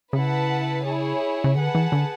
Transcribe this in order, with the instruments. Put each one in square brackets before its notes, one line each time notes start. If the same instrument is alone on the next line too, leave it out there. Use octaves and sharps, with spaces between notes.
[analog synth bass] C#3 [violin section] E4 B4 F#5 A5
[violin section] E4 G#4 C#5
[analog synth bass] C#3
[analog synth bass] D3 [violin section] G#4 B4 F#5 A5
[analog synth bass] E3
D3